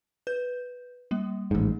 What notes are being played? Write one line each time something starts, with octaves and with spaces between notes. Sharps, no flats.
B4 G6
G3 A#3
A1 G#2